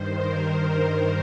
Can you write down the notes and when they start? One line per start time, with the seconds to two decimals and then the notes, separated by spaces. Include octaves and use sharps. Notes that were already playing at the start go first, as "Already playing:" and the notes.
Already playing: G2 D#3 C5
0.14 A#4